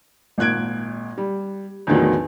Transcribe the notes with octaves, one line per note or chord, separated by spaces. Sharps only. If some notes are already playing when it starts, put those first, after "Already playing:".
G#1 A#2 F#6 G#6 D7
G3
E2 A2 D3 D#3 F3 F#3